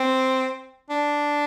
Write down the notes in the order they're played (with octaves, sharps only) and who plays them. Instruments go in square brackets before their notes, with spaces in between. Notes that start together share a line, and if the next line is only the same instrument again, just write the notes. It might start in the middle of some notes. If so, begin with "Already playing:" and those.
Already playing: [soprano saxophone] C4
D4